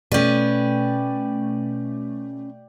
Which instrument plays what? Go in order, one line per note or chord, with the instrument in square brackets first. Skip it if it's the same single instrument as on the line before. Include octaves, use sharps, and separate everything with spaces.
[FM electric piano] B2 A3 [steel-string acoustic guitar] C#4 B4 [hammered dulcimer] D5 G5